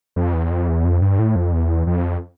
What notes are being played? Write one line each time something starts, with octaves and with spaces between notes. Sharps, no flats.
F2
E2
F2
E2
F2
G2
A2
F2
E2
F2